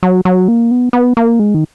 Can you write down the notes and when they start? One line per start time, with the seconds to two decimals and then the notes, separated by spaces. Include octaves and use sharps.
0.03 F#3
0.25 F#3
0.48 A#3
0.71 B3
0.93 B3
1.17 A#3
1.39 G#3
1.54 D#3